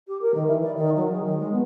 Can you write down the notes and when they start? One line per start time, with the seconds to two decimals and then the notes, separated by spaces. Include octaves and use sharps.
0.07 G4
0.21 A#4
0.34 D#3
0.46 E3
0.62 D5
0.75 D#3
0.95 F#3
1.11 G#4
1.23 D#3
1.38 G#3
1.52 B3